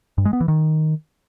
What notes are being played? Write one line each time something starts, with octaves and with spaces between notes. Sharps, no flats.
G2
G#3
B3
E3
D#3